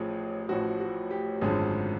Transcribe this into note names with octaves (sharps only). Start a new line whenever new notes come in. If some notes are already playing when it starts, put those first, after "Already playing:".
Already playing: A1 A2 F3 G#4
A1 A2 F3 F#4
F#4
G4
G#1 F#2 D3 F3 G#4